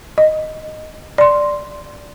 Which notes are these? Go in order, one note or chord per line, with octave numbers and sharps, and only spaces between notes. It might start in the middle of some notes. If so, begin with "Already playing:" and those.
D#5
D5 C6